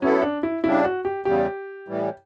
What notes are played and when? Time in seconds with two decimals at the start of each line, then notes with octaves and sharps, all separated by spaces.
0.01 F#3 B3 C#4 E4 A4
0.22 D4
0.43 E4
0.64 C#3 G3 D4 E4
0.84 F#4
1.05 G4
1.25 E2 C#3 G3 G4
1.88 A2 E3 G3